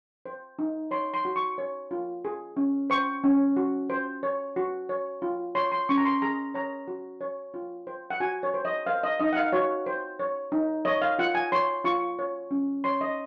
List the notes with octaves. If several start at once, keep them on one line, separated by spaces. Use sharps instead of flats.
C5
D#4
C#5 C6
C6
F#4
C#6
C#5
F4
G#4
C#4
C5 C#6
C#4
F#4
C5
C#5
F#4
C#5
F4
C#5 C6
C6
C#4 C#6
A#5
C6
G#4 A#5
C#5 A#5
F#4
C#5
F4
C5
F#5
F#4 G#5
C#5
C5
D#5
C5 F5
D#5
D#4 D#5
F#5
F5
F#4 C#5
C5
C#5
D#4
C#5 D#5
F5
F4 F#5
G#5
C#5 C6
F4 C#6
C#5
C#4
C#5 C6
D#5